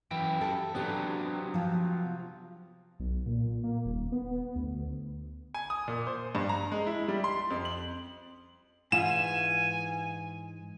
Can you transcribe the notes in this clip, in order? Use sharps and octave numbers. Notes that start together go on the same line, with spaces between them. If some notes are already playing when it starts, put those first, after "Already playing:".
F#2 E3 E4 G5
G4 A4
C3 F#3 B3 C4 D4 G4
F3 F4
B1
A#2
A#3
D#1
B3
D2
G#5
D#6
A#2
C5
G2
A#5
G#3
E4
G3
C6
F2
F#7
G#2 E3 F4 G#5 E7